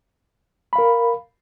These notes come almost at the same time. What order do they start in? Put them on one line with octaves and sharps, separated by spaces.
B5 F5 A#4